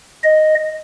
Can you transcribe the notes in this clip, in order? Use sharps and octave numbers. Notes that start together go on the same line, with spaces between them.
D#5